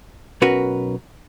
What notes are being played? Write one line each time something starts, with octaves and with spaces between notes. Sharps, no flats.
B1 C#4 F#4 A#4 B4